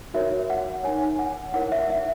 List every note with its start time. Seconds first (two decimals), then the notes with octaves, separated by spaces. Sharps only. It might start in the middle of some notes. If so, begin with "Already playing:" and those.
0.14 F#4 A#4 C#5 E5
0.50 F#5
0.84 D#4 A#4 C#5 G#5
1.19 F#5
1.54 E4 A#4 C#5 F#5
1.72 E5
1.90 E5